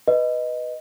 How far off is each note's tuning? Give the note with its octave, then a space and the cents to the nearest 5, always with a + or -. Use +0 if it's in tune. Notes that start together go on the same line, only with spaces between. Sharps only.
B4 +0 D#5 +0